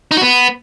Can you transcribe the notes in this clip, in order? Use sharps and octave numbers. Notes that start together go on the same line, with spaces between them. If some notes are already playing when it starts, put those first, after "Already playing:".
D#4
F#4
B3